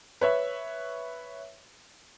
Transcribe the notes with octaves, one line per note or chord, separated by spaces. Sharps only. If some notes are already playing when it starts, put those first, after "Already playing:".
B4 C#5 E5